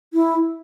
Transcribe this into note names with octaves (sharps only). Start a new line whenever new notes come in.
E4